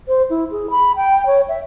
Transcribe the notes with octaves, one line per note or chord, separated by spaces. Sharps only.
C5
E4
G#4
B5
G5
C#5
E5